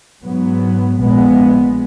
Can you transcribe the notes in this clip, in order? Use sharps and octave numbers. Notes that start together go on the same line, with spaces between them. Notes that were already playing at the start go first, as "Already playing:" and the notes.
G#2 F#3 B3
A#1 A#2 G#3 B3